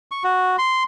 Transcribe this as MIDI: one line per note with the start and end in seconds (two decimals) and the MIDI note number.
0.11 0.23 85
0.24 0.56 66
0.58 0.83 84